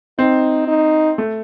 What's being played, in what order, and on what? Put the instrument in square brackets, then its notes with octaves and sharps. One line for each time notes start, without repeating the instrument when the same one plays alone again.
[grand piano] C4 [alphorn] D#4
[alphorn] D#4
[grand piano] A3